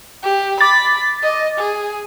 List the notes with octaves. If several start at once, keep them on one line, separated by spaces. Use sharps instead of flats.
G4
B5 D6 A6
D#5
G#4